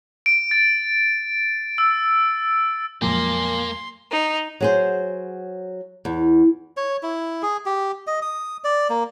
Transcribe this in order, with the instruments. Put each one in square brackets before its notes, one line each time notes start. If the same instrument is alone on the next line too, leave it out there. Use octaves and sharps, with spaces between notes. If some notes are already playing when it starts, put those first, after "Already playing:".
[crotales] D7
A6
E6
[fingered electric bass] F2 F#3 G#3 [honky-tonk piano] A#2 F3 [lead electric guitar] A#3 [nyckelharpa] C6
[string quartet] D#4
[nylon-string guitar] F#3 G#4 C5
E2
[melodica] C#5
E4
G#4
G4
D#5
D#6
D5
A#3